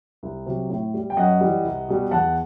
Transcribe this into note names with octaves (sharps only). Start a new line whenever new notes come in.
C2
C3 F#3
A2
G3
G5
F#2 D#5 F#5
E3 G3
C2
B2 G3
E2 F#5 A5